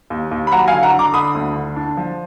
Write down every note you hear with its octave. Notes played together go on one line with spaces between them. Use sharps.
D#2
D#2
B5
F#3 F#5 A#5
F5 G#5
D3
F#5 A#5
D3
A#5 D6
D3 B5 D#6
D2
D3
D4
F3